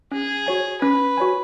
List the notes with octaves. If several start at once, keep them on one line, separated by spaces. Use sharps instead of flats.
C#4 G#4
F#4 C#5 G#5
C#4 B4
F#4 C#5 G#5